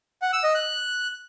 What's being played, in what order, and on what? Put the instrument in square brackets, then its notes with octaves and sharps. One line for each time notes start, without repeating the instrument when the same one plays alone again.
[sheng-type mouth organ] F#5
E6
D#5
F#6